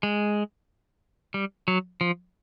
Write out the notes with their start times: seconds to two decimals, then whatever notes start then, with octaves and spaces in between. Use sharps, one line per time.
0.03 G#3
1.34 G3
1.68 F#3
2.01 F3